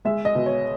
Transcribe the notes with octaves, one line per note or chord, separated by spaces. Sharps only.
G#3 E5
D#5
B2
C#5